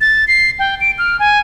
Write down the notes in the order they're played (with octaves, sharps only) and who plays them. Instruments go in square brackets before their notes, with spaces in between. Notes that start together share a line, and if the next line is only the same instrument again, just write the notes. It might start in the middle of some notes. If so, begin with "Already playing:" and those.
[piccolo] A6
C7
G5
D7
F6
G#5